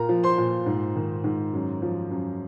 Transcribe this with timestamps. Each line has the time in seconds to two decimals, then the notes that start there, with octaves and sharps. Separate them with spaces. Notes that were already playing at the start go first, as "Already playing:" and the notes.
Already playing: A#2 A#4 A#5
0.09 F3
0.23 C5 C6
0.38 A#2
0.66 G#2
0.96 D#3
1.24 G#2
1.54 F#2
1.82 F3
2.11 F#2